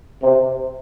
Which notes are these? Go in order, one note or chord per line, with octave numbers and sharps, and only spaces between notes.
C3